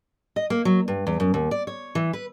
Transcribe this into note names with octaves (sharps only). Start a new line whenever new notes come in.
D#5
A#3
F#3
G2
E2
F#2
D#2
D5
C#5
E3
B4